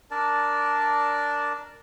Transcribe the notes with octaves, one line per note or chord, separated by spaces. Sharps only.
D4 A#4 D5 A5